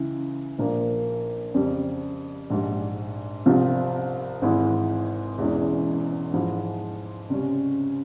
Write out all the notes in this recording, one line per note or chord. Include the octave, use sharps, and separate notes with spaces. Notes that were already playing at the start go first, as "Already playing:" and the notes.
Already playing: C#2 C#3 E3
A#1 A#2 F3 A#3
F2 C#3 G3
A#1 G#2 G3
C2 C3 F3 C4 F4
G#1 G#2 E3 G#3 E4
E1 E2 E3 G#3 C#4
G#2 F3 G#3 E4
C#2 C3 G3 C#4